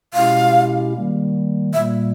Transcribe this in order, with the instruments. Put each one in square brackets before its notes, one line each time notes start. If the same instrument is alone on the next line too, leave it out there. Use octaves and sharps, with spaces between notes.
[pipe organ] B2 G#3 C#4 E4 G4 [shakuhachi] F5
[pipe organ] D#3 G3 A#3
[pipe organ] A#2 G3 A#3 [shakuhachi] E5